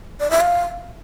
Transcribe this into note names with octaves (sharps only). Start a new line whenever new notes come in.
D5
E5
F5